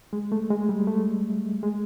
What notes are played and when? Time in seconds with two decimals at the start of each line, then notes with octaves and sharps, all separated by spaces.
0.13 G#3
0.32 A3
0.50 G#3
0.69 G3
0.87 A3
1.63 G#3